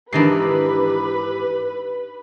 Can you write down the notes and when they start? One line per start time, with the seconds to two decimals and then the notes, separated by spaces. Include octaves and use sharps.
0.13 G#2 D#3 E3 D4 D#4 G4 B4 C7